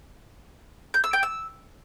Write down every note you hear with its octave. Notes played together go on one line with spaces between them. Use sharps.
G6
E6
G5
E6